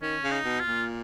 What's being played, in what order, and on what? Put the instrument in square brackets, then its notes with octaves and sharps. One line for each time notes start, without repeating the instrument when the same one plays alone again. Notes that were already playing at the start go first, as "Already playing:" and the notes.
[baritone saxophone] D#3 [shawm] C#4
[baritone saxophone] C#3
[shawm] D#4
[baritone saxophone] B2
[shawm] F4
[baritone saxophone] A#2